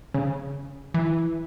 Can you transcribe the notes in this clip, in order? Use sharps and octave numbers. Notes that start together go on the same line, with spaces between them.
C#3
E3